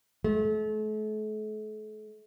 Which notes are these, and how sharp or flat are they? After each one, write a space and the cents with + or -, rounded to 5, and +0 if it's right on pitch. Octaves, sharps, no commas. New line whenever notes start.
A3 -40